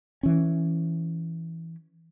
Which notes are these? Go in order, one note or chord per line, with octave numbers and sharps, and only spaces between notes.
E3 C#4